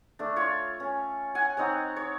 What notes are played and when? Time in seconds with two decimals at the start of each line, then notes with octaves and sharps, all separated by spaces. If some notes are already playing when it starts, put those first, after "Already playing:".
0.19 A3 D4
0.36 F4 C#5
0.80 C#4
1.35 F#5 G#5
1.57 C4 D#4 C#5 F#5
1.96 C#5